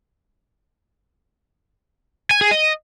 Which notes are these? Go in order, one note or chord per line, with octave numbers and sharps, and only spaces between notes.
G#5
G#4
D#5